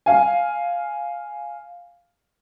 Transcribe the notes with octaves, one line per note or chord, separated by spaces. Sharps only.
F5 G#5